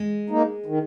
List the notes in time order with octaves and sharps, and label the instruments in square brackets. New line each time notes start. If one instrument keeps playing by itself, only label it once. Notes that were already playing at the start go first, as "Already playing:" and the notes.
Already playing: [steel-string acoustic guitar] G#3
[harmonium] A#3 D#4
D#3